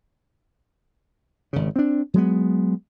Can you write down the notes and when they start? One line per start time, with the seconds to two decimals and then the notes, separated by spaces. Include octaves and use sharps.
1.53 G#1 C#3
1.76 C4 D4
2.14 F#3 G#3 B3